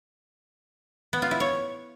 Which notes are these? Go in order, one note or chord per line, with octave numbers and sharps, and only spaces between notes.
B3
F4
E4
C#5